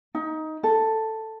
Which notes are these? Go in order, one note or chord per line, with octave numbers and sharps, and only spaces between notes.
D#4
A4